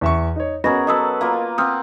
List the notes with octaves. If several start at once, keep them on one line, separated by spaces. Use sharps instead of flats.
E2 E5 C#6
D#4 C#5
B3 C#4 F#4 G#4 A#4 D#5 B5 A#6
F#3 A4 B4 D#5 D#6 E6
A#3 F4 B4
C4 F#5 D#6 F6